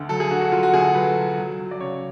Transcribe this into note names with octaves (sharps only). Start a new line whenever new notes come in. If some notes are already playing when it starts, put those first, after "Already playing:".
Already playing: D2 D3
F#3 A4
G#4
D3 F#4
F#4
F#3 F4
F#4
D2 G#4
A4
F#3 B4
F#3
F#3
F#3
D5
C#3 C#5